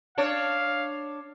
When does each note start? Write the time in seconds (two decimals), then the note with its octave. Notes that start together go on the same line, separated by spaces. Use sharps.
0.18 D4 C#5 F5